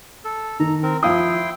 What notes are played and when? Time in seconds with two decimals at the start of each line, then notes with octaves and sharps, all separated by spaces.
0.25 A4
0.60 D#3 A#5
0.83 C4 A#4
1.03 F3 E4 F5 G5 C6 D#6